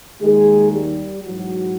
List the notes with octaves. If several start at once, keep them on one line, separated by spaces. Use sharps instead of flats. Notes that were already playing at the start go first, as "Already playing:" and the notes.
D#2 D#3 G#3 G#4
G3 G4
G#2 E3 F#3 F#4